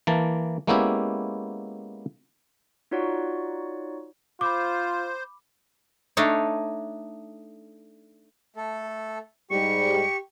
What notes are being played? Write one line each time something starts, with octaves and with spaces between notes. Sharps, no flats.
E3 A#3 A5
G#3 A#3 B3 C#4 E4 G4
D#4 F4 F#4 C#5 D5 F#5
F4 C5 B5 D6
A3 D4 D#4 C#5
A3 A4
G#2 G3 G4 C#6 C#7